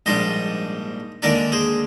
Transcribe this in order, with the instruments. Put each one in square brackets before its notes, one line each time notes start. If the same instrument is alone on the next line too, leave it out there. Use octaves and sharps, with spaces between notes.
[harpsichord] A#1 G#2 G3 D4 C5 D#5
D#2 D3 G#3 D4 A#4 D5
G#4 C5